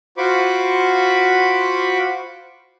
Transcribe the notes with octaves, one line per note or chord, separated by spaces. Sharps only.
F4 F#4 C5 B5 C#6 D6